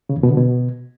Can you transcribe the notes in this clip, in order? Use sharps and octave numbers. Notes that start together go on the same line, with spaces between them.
C#3
E2
B2
D3
B2